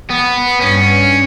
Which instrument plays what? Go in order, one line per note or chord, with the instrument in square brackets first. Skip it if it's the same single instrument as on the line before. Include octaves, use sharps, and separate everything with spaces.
[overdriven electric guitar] B3
[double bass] G2 [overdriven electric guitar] C#4